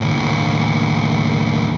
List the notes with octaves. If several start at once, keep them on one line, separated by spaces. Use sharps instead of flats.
D#2 A2